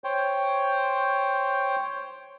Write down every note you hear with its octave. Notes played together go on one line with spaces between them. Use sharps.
C5 C#5 G5